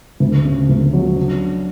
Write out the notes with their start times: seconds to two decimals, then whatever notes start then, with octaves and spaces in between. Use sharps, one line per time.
0.20 D2
0.45 C#3
0.69 D2
0.93 F#3
1.17 D4